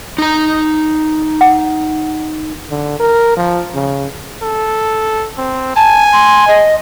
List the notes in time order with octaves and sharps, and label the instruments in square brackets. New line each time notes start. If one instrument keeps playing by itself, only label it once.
[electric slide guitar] D#4 A#5
[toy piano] F#5
[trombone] D3
A#4
F3
C#3
[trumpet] A4
C4
[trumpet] G#5 [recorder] A5
[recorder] C6
D#5